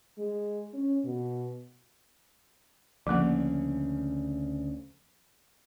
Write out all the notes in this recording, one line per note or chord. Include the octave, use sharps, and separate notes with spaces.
G#3
C#4
B2
D2 C#3 F3 A#3